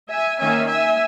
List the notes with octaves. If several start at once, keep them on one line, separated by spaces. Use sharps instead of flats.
E5 G#5
D#3 A#3 C#4 E5 G#5
E5 G#5